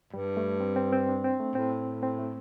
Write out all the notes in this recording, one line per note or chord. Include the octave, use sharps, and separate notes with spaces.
G2 G3
A3
C4
C4
C4
D4
C4
A3
A2 C4
C4
A3